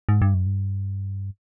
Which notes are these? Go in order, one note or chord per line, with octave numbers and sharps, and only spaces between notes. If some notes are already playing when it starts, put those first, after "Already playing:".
G#2
G2
F#2
G2